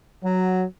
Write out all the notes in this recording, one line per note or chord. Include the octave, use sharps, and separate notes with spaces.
F#3